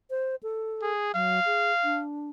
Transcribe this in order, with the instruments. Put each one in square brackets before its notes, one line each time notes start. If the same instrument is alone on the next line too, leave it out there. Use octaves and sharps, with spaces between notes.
[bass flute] C5
A4
[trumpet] G#4
[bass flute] F#3 [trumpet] F5
[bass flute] G#4
D4